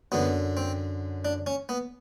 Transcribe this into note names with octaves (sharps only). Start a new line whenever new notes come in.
F#2 D3 B3
C4
D4
C#4
B3